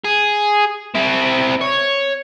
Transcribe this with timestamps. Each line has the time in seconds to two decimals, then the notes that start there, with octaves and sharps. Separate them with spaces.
0.04 G#4
0.95 C4 E4
1.62 C#5